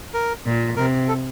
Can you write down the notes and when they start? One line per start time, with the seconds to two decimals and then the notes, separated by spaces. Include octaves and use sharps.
0.14 A#4
0.46 A#2
0.77 C3 A#4
1.08 A4